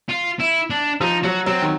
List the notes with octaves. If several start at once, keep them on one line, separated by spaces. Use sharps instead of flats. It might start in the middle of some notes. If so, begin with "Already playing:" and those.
F4
E4
D4
F3 D#4
F#3 F#4
F#3 C4
D#3